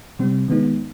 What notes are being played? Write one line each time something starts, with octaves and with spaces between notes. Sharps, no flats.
C3 G3 C4
D#3 G#3 B3 D#4